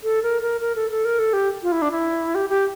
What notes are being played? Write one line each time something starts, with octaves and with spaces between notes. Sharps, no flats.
A4
A#4
A#4
A#4
A4
A4
A#4
A4
G4
F4
E4
D4
E4
G4
G4